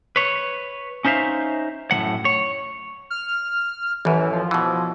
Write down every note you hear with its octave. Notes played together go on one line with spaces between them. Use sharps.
B4 C#5
C#4 D#4 C5 E5 F5
F#2 A2 F#3 F#5
C#5
F6
A1 F#2 E3
F3
B2 E3